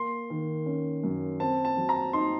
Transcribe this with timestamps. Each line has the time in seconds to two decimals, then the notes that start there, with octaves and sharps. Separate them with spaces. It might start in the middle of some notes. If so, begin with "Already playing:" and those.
Already playing: A#3 C6
0.30 D#3
0.66 C#4
1.04 F#2
1.40 C4 A5
1.65 A5
1.77 F#3
1.89 A#5
2.13 D#4 C6